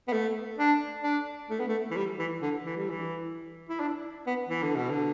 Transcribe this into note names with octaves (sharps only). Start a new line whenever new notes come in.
B3
A3
D4
D4
A3
B3
A3
E3
G3
E3
D3
E3
G3
E3
E4
D4
B3
E3
D3
B2
D3